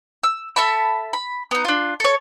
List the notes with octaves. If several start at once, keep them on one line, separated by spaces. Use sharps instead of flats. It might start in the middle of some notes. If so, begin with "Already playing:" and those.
E6
A4 E5 A5 B5
B5
B3 D#4
D4 F4
A4 C#5